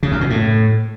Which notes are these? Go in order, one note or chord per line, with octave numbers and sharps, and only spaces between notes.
C#3
F#2
B2
A2